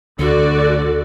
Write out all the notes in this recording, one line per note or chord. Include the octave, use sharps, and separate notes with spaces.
D2 D3 F#4 A4 D5